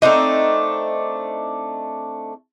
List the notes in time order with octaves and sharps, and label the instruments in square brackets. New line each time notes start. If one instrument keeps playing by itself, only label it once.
[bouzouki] A3 C4 D4 D#4